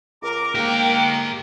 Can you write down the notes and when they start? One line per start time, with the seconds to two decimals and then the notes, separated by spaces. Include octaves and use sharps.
0.23 C#2 A#4 A#5 D6
0.55 G#2 G#3 A#3 G4 G5 A#5